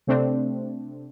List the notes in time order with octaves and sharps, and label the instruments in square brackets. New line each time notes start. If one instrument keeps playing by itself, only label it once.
[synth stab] C3 A3 C4 D4